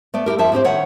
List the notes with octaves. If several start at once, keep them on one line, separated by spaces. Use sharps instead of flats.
A3 B3 D5
A3 E4 G4 A#4
F2 F3 E5 A5
A2 C4 G4 C5
D#3 C#5 E5 F#5